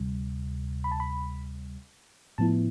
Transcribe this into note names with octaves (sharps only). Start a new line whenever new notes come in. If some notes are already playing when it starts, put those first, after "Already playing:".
Already playing: D2 C3 G3
B5
A5
B5
A2 F3 B3 E4 A5